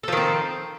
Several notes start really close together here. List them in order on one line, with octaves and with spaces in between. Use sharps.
A4 F3 D#3 C4